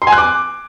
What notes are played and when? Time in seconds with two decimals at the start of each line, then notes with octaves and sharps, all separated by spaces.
0.02 C6
0.07 G#5
0.12 F#6
0.18 D6